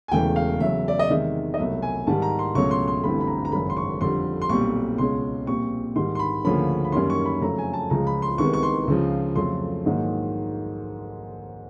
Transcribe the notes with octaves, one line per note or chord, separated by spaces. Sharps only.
G#5
E1 E2 C#3 E3 A3 G5
F5
E2 C#3 F#3 E5
D5
D#5
E2 C3 D#3 G#3 E5
D#5
C2 B2 F#3 A3 E5
G#5
G#2 D#3 G3 A5
A#5
C6
C#2 B2 F#3 A3 C#4 C#6
C6
C6
G1 G2 E3 A3 C4 B5
B5
A#5
A#5
G#1 F#2 C#3 B5
C6
C#6
F2 D3 G3 C6
C6
B1 A#2 G3 C4 C#6
C#2 B2 G#3 C#4 C6
A#1 A#2 G3 C4 C#6
G#2 D#3 G3 C6
C6
B5
D2 C#3 F3 A#3 C#4 B5
B5
F#2 D#3 G3 A#3 C#4 C6
C#6
B5
F2 C#3 F#3 A3 A#5
G#5
A5
C#2 C#3 F3 G#3 A#5
B5
C6
C2 C3 D#3 G#3 B3 C#6
C#6
C6
C#2 C#3 F3
F2 C#3 F#3 A3 C6
A#1 G#2 D#3 F#3 A#3